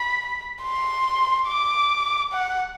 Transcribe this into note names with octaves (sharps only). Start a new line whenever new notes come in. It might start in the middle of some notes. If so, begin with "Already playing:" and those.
Already playing: B5
C6
D6
F#5